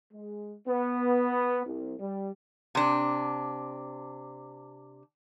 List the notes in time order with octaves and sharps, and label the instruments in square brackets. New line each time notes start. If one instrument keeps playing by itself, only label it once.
[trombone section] G#3
B3
C2
G3
[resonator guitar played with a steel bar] C3 D4